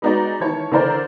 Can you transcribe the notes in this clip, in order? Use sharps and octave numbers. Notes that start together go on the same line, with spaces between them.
G#3 B3 D#4 F#4 D5
D#3 E3 C#5 A5
D3 E3 D4 A#4 C5 D5